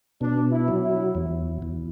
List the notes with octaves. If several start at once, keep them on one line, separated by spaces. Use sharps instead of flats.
B2 D4
E4
F#3
E4
E2
E2